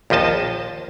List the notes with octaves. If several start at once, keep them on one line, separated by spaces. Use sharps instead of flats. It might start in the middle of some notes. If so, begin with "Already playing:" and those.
A#1 D#2 F3 D#5 A5